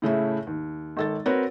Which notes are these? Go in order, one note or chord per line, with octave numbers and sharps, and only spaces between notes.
A2 C#3 A3 E4
D#2
G#1 A4 A6
C4 F#4 A#4 B4 C#5